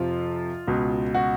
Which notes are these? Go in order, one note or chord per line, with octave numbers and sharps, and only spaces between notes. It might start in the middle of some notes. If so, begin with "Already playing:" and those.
Already playing: F2 C3 F3 F4
C#2 B2
F#4